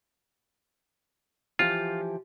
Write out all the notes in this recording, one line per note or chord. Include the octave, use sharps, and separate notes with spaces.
E3 F3 F4 G4